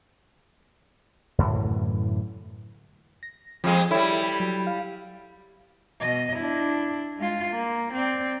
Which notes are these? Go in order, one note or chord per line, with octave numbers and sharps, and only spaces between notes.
F#2 A2 D3 E3
A#6
F2 F3 G#3
G3 E4 A4 C#5 E5
F#3
F5
B2 D#5
D4 E4
G#3 F4
A#3
C4 D5